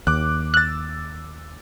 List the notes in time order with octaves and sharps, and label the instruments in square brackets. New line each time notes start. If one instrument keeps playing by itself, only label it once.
[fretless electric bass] D#2 [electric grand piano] D6 F#6
[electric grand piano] E6 A6 [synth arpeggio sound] F#6